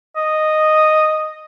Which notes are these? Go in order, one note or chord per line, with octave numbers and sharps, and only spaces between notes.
D#5